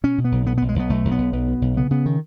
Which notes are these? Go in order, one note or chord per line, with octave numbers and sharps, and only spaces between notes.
B2 C#4
B2
B3
B1
B2 B3
B1 B3
G#3
B1 B3
B1 A3
B1
B3
B1
B1 B3
B2
B1
C#3 B3
C#3 B3
D#3